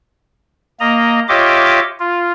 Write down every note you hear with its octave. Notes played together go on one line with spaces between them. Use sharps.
A#3 D#5 A#5
F4 G4 C#5 D#5 E5 D6
F4